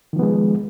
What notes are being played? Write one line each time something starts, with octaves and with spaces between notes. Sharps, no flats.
D#3 F3 G#3 B3